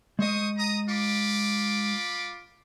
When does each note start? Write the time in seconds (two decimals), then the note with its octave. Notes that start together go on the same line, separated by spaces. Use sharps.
0.19 G#3 C5 D#5 C#6 D#6
0.57 A#5 D#6
0.89 F4 B5 D6